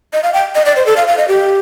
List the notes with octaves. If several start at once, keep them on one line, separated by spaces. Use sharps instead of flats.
D#5
F5
G5
D#5
D5
C5
A4
F5
F5
D#5
G4